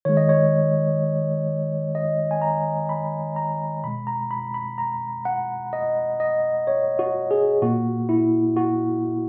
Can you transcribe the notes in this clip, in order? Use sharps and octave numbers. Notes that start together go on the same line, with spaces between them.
D#3 G#3 C#5
D#5
C#5
D#5
G#5
A#5
B5
A#5
B2 G#3 B5
A#5
B5
B5
A#5
F#5
D#5
D#5
C#5
F#4
G#4
A#2 A#3 F#4
E4
F#4